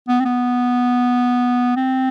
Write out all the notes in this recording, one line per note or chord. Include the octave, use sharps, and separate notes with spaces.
B3
C4
B3
C4